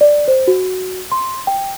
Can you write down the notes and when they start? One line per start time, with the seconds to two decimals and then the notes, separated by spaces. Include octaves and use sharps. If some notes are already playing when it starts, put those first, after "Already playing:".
0.01 D5
0.28 C5
0.47 F#4
1.12 C6
1.47 G5